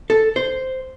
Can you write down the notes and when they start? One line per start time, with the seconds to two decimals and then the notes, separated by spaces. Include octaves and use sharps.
0.10 A4
0.36 C5